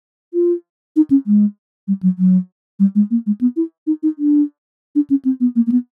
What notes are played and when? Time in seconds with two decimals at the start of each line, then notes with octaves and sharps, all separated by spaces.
0.34 F4
0.96 D#4
1.11 C#4
1.27 G#3
1.88 G3
2.03 F#3
2.19 F#3
2.79 G3
2.95 G#3
3.11 A#3
3.26 G#3
3.41 B3
3.56 E4
3.87 D#4
4.03 D#4
4.19 D4
4.95 D4
5.10 C#4
5.25 C4
5.40 B3
5.56 A#3
5.67 A#3
5.72 B3